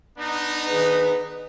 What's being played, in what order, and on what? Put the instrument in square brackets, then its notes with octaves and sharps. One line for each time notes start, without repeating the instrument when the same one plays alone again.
[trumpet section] B3 D4 D#4
[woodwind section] D#3 G#4 B4